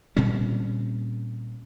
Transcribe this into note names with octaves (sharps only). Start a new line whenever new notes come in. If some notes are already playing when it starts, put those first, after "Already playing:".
A#2 G3 C4 C#4